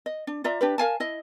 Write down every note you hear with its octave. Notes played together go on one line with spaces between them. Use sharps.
D#5
D4
F4 D5 E5 A#5
D4 G4 B4
A#4 F5 G#5 A5
E4 D#5